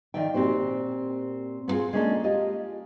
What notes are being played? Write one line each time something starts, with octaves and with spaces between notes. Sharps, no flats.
D#3 F3 D5 E5 G5
A#2 C4 F#4 G4 C5
B3 C4 D#4 F4 G#4
G#3 A#3 C#4 D4 G4 A4
F4 G4 D#5